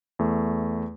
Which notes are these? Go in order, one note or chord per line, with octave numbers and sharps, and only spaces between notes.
E2 A3